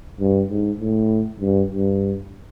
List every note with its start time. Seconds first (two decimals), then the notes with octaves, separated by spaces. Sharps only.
0.20 G2
0.50 G#2
0.80 A2
1.40 G2
1.70 G2